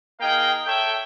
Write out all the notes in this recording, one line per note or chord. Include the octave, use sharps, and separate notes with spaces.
A#3 D#4 G#4 F5 G5
A4 C#5 E5 G5